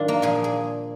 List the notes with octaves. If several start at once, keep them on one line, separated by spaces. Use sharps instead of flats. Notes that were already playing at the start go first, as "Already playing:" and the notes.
Already playing: G#2 D#3 F#3 D4 F4
A#3
A#2 F3 G#4
G#4